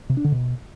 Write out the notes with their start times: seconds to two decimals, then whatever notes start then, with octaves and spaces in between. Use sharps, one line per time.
0.09 C3
0.17 D4
0.24 D3
0.32 B2